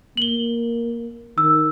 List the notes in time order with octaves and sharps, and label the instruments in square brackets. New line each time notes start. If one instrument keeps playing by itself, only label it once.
[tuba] A#3 [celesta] F#7 G7
[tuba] D#3 [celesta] E6